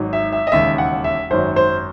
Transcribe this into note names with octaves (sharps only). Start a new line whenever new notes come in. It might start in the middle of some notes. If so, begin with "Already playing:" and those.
Already playing: G#1 G#2 F#3
E5
E5
D#5
E1 D#2 C#3 E5
F#5
E5
G#1 F#2 D#3 F#3 C5
C5